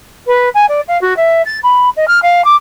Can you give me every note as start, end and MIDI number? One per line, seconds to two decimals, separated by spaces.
0.26 0.49 71
0.54 0.65 80
0.68 0.80 74
0.87 0.99 77
1.01 1.16 66
1.16 1.42 76
1.45 1.58 93
1.63 1.89 83
1.96 2.07 75
2.07 2.19 89
2.22 2.44 77
2.44 2.55 86